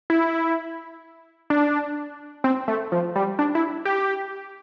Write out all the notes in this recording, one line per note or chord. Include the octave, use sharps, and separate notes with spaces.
E4
D4
C4
A3
F3
G3
D4
E4
G4